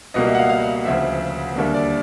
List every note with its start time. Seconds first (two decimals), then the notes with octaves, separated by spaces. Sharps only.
0.14 C#2 B2 G3 A#3 D#5
0.27 E5
0.35 F#5
0.38 F5
0.50 F5
0.85 D2 C#3 F3 E5
1.56 D#2 D3 G3 A#3 E5
1.74 D5